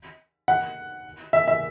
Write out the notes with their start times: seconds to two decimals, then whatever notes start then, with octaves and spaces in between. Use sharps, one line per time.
0.48 F#5
1.33 E5
1.48 E5